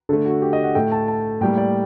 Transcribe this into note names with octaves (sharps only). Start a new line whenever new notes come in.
D3 A3 A4
F#4
G4
D#5
F#5
A2 A3 G5
A5
A5
A2 G3 A#3 G5
D5